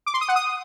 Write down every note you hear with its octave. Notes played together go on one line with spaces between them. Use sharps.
D6
C6
D#6
F#5
D#6